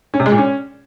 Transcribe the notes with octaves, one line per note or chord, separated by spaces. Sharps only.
C#4
C3
G#3
A#2
C#4